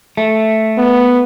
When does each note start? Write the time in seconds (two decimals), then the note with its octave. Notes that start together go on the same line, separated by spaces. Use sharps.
0.17 A3
0.78 B3